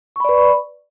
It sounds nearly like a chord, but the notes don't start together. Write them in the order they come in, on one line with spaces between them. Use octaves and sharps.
C#6 B5 D5 B4